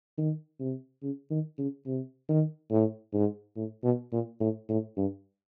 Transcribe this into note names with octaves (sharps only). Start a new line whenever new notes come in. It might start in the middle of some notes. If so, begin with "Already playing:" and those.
D#3
C3
C#3
D#3
C#3
C3
D#3
A2
G#2
A2
B2
A#2
A2
A2
G2